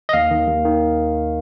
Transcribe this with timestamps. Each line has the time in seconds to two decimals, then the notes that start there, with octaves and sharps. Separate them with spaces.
0.09 D#5
0.13 D#2 F5
0.31 D#3
0.47 D#2
0.65 D#3